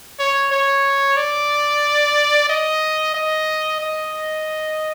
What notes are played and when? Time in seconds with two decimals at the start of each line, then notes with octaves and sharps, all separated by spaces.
0.19 C#5
0.52 C#5
1.17 D5
2.49 D#5
3.14 D#5
3.81 D#5